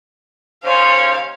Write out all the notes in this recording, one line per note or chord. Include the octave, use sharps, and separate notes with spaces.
D#2 C#3 C5 C#5 F5